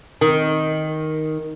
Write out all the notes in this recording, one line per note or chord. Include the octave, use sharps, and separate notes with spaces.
D#3